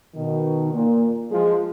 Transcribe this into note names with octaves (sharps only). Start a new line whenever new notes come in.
B2 D#3
A#2
F3 G#3